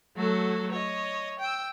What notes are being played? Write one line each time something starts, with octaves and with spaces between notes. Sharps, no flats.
F#3 A3 F#4 A4
C#5 D#5
G5 E6